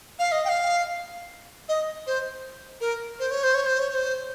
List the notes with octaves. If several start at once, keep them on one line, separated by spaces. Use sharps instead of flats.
F5
D#5
G5
F5
D#5
C5
A#4
C5
C#5
C5
C#5
C5
C#5
C#5
C5